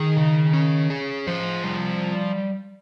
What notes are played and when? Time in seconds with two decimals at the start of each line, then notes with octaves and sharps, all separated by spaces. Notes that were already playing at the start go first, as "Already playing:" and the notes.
Already playing: D#3 G#4
0.17 C#3
0.53 C#4
0.90 G#4
1.27 F3 C5
1.64 G3